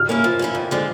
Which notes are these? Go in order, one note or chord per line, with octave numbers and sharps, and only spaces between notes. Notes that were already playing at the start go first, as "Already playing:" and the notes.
Already playing: F6
A#3 C#4 E4
F3
A#3 C#4 E4
F2
D3 F3 G#3